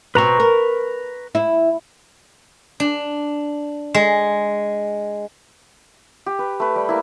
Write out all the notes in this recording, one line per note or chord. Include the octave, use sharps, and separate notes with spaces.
B2 C4 B4 A#5 C#6
A#4
E4
D4
G#3
G4
B4
A3 B4
G3
A#3 E4